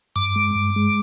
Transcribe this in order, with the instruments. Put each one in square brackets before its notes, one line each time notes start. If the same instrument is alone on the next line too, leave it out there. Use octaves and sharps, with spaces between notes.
[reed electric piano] G2 [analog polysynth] D6
[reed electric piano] G#3
G2
G#3